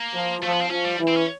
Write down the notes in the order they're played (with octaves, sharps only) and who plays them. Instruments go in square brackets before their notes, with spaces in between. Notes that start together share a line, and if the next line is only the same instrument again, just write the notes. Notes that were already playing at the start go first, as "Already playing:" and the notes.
Already playing: [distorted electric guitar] A#3
[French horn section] F3
[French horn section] F3 [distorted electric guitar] A3
[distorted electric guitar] B3
C4
[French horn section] F3 [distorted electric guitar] C#4
[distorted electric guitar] G3
[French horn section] E3
[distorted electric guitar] C4
C#4